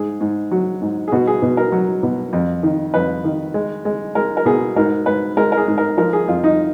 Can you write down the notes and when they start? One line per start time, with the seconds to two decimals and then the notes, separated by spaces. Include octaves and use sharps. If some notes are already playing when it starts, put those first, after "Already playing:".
Already playing: G#2 G#4
0.21 G#2
0.51 F#3
0.82 G#2
1.08 G#4
1.12 B2 F#4
1.27 G#4
1.42 B2
1.57 A#4
1.72 F#3
2.03 B2
2.33 F2
2.63 D#3
2.94 F2 B4
3.24 D#3
3.54 G#3
3.85 G#3
4.15 G#3 A#4
4.37 A#4
4.45 B2 G#4
4.76 G#2 A#4
5.06 G#2 B4
5.37 G#3 A#4
5.52 A#4
5.57 G#4
5.68 G#2
5.78 A#4
5.97 F3 A#4
6.13 G#4
6.28 F2 F4
6.44 D#4